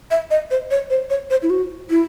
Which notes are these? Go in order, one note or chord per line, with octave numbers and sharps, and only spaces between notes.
E5
D#5
C5
C#5
C5
C#5
C5
E4
F#4
E4